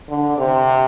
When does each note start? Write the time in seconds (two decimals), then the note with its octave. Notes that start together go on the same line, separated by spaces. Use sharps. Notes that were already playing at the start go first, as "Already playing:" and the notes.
0.09 D3
0.38 C3